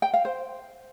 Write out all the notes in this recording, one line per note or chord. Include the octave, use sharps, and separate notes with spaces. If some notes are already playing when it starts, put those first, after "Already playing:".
G5
F5
C5